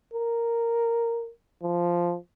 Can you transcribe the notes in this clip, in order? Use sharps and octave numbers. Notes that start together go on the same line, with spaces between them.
A#4
F3